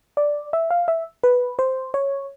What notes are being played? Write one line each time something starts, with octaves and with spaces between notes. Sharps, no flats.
D5
E5
F5
E5
B4
C5
C#5